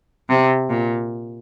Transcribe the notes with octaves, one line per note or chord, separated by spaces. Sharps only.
C3
A#2